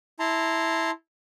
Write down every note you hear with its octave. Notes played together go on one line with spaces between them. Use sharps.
E4 A5 A#5 C6